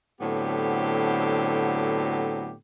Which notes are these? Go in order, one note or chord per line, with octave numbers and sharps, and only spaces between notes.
A2 D3 F#3 B3 C4 G4